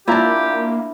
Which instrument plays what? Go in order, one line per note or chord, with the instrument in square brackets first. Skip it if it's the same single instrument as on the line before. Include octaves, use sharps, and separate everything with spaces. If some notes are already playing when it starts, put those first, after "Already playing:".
[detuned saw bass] A#3 [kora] D4 E4 [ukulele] F4 D5 A#5 [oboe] G4